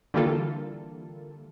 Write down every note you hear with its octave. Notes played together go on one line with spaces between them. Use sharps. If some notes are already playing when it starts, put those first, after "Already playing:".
D3 E3 G3 A#3 F4 A4